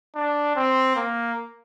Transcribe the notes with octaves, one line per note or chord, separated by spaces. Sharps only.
D4
C4
A#3